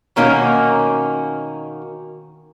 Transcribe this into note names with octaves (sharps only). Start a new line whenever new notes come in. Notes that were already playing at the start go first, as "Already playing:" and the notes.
B2 D#3 A#3 C#4 D#4 F#4